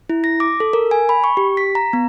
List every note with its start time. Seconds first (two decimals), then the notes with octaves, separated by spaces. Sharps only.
0.09 E4
0.24 A#6
0.40 D6
0.60 A4
0.73 A#4
0.91 G#5
1.09 B5
1.24 C#6
1.37 G4
1.57 B6
1.75 A#5
1.93 B3